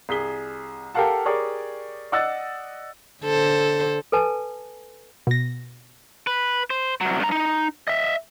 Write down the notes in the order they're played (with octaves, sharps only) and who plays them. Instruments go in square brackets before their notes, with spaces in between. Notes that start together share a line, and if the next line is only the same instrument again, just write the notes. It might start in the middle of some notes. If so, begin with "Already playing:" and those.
[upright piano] C2 G#4 B6 G7
G4 A4 A#4 F5 F#5 A5
G4 G#4 A#4 C#5 D5
D5 D#5 F#5 E6 F#6 A6
[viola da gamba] D3 A4 C5
[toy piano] A4 B4 G#5 A5
[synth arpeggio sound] B2 A#6
[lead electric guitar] B4
C5
C2 F#3
G2 A#5
D#4
D#5 E5